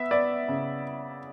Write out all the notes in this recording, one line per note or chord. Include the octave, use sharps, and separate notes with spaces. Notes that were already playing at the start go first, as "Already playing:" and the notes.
Already playing: B3 E5
B3 D5
C#3